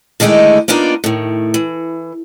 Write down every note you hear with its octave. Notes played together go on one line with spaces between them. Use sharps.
D3 D#3 G#3 A3 D#4 E4
A#3 B3 D4 D#4 F4
A2 D#3
E3